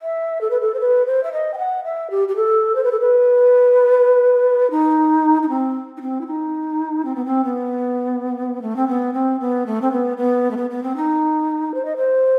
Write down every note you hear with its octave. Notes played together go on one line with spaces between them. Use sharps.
E5
A4
B4
A4
C5
B4
C5
E5
D#5
G5
F#5
E5
G4
G4
A4
C5
B4
A4
B4
D#4
D#4
C4
D#4
C4
E4
D#4
C4
B3
C4
B3
A3
C4
B3
C4
B3
A3
C4
B3
B3
A3
B3
B3
C4
D#4
C5
D#5
C5